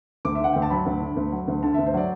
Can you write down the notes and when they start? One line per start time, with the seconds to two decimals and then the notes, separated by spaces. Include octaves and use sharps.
0.25 D2 D6
0.35 E5
0.40 D3 F#5
0.53 D2 G5
0.62 A5
0.70 F#3 B5
0.86 D2
1.01 D3
1.17 D2
1.32 F#3
1.48 D2
1.63 D3 A5
1.74 D2 E5
1.86 C5
1.94 F#3 D5